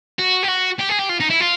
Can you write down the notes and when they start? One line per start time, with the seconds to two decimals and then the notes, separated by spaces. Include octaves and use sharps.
0.19 F#4
0.43 G4
0.49 F#4
0.79 G4
0.89 G#4
0.99 G4
1.09 F4
1.20 D#4
1.30 E4
1.40 F4